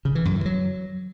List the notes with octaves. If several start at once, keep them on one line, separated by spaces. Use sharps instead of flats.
C#3
E3
F#2
E3
F#3